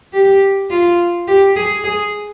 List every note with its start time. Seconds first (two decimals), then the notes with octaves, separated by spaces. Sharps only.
0.13 G4
0.70 F4
1.28 G4
1.56 G#4
1.84 G#4